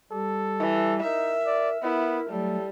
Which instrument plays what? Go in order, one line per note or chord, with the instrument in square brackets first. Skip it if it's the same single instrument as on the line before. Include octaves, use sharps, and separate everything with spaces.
[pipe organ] G3 G4 [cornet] A4
[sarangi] E3
[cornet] D#4 [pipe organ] A#4 [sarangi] E5
[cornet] D5
[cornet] B3 [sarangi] E4 [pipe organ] A#4
[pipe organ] F#3 A3 [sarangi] G3 [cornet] A4